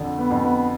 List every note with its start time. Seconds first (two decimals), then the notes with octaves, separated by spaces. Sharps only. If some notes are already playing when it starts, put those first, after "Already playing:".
Already playing: F2 D3
0.18 B3
0.31 F2
0.43 B3